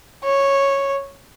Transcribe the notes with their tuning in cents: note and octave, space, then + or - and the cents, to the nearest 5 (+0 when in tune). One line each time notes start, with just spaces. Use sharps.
C#5 -5